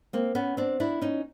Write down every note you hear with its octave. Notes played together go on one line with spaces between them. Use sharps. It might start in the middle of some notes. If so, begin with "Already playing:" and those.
A#3 C4
B3 C#4
C4 D4
D4 E4
C#4 D#4